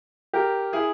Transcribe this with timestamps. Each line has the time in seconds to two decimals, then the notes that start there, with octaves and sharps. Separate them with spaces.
0.33 G4 A#4
0.73 E4 G#4